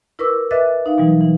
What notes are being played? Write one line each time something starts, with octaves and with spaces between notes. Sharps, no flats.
E4 A#4 B4 C#6 D6 E6
B4 D#5 E5 D6 F#6 A6
D#4 F5
B2 E3 F#3 G3
E3